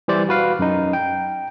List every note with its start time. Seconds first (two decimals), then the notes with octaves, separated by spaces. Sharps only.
0.08 E3 G3 C5 D5
0.29 F#4 B4 F5
0.59 F#2 D#4
0.93 G5